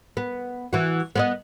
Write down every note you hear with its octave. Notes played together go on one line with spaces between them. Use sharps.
B3
E3 F#4
B3 B4 D#5